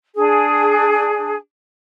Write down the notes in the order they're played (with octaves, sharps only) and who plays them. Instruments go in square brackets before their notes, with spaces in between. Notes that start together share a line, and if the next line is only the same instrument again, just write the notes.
[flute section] D4 G#4